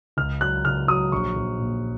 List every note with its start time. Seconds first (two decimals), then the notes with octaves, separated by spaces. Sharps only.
0.17 C#2 F6
0.41 F#3 F#6
0.65 C#2 F6
0.88 F#3 D#6
1.12 A#1 C#6
1.36 A#1
1.59 A#2